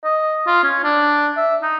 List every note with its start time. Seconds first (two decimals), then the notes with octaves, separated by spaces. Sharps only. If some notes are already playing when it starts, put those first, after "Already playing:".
0.04 D#5
0.47 F4
0.63 C#4
0.83 D4
1.37 E5
1.62 D#4